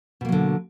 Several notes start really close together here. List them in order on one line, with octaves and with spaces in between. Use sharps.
B2 A#3 F#3 D3